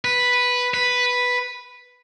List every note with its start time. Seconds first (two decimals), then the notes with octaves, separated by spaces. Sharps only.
0.05 B4
0.74 B4